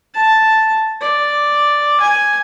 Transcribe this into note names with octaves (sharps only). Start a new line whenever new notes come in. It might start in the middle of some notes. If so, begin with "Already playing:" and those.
A5
D5
G#5